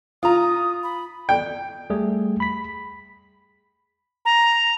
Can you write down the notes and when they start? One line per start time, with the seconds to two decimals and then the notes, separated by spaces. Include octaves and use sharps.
0.23 F4 A#5 D#6
0.83 B5
1.29 G5
1.90 G3 A3 G#4
2.40 B5 B6
4.25 A#5